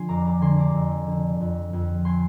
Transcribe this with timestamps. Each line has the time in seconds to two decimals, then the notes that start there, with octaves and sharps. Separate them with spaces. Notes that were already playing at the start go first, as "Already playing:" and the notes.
Already playing: D3 F3 G#5 C6
0.09 F2 A#5 D6
0.25 A#5 D6
0.41 D3 G#5 C6
0.58 A#5 D6
0.74 F2
1.07 D3
1.40 F2
1.73 F2
2.05 G#5 C6